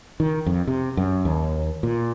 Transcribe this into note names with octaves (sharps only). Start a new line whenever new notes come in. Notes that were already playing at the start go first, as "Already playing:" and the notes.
D#3
F2
C3
F#2
D#2
A#2